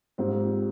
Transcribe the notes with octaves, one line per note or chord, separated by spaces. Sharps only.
G#2 G3 C4 F4